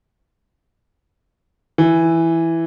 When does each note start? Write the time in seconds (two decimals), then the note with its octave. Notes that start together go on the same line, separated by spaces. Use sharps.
1.78 E3